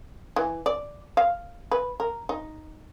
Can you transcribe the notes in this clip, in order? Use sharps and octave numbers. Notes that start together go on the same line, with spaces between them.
E3
D5
F5
B4
A#4
D#4